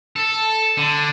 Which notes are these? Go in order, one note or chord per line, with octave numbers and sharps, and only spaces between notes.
A4
D3